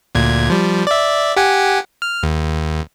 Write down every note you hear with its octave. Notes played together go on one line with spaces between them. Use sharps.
D2 A#2 G#6
F3 G3
D5 E5
G4 F#5 G#5
F6
D#2